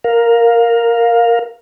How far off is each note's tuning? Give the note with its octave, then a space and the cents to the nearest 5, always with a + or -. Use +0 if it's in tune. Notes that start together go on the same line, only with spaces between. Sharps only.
A#4 +0 F5 +10